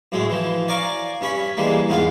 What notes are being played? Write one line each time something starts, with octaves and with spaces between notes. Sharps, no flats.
F#2 A2 G#3 A3
E3 F3
C#5 D5 F5 G#5 A#5 D6
G2 C#4 C#5 B5
E3 G3 G#3 A#3
E2 G#2 G#3 B3 F4 F5